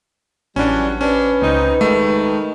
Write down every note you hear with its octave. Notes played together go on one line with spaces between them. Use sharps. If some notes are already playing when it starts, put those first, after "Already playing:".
A1 E3 F#3 G3 C#4 D4
C3 C#4 D4 B4
C#2 C4 D#4
G2 D#3 G#3 A3